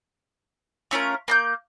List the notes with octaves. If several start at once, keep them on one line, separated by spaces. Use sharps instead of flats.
A3 C#4 F4 A#4
A#3 A#5 G6